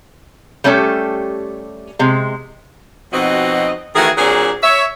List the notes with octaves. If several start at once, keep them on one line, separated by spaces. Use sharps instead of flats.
G3 A3 C#4 G4 A4
C3 G#3
F2 B2 C4 D#4 F#4 D#5
D#3 E3 A3 F#4 G#4
A#2 F#3 C4 D4 G#4
C#5 E5